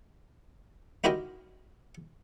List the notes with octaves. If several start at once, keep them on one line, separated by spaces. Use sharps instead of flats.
D#4 E4 F#4 G4 A#4 D#5